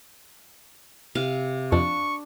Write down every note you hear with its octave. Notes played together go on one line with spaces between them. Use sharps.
C3 F5
F2 D4 C#6